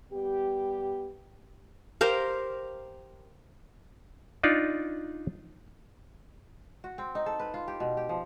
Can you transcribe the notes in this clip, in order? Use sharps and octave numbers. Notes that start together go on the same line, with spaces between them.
G3 B3 G4
G4 A#4 C5 F5
D4 D#4 F4 D5
F#4
C4
D#4
A4
B4
F4
G4
B2
G4
F3